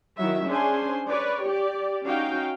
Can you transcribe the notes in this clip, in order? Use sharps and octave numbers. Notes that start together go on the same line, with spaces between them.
D#3 F#3 E4 E5
C#4 D4 G#4 C5 G#5 C6
B4 C#5 D5
G4 D5
C#4 D#4 F#4 F5 G5